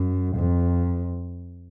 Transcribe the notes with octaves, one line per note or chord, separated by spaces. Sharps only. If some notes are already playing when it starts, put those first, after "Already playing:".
Already playing: F#2
F2